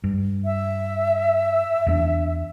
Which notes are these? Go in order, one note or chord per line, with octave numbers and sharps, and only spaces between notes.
G2
E5
E2 A3 D4